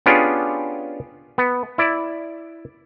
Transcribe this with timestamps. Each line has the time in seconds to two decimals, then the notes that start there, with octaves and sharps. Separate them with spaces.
0.06 B3 C#4 D4 F4 G4 G#4
1.38 B3
1.78 E4 D5